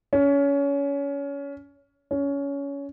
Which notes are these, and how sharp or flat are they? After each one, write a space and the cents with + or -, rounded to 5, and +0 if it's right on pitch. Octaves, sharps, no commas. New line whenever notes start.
C#4 +25
C#4 +20